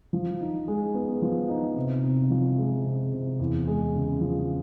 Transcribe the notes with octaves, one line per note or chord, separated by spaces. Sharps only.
F3
D#4
G#3
B3
F3
D#4
C3
C3
F3
G#3
C3
C3
E2
G#3
C#3
F3